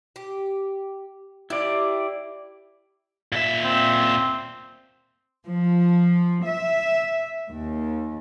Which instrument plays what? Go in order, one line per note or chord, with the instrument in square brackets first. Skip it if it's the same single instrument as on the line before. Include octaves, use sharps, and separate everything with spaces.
[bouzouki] G4
[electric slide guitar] E4 D5 [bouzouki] G4
[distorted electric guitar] A#2 E5
[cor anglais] C4
[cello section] F3
E5
D#2